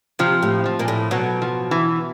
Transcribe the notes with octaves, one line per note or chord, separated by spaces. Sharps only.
C3 F3
A2
F3
A#2
A2
B2 F#3
F3
E3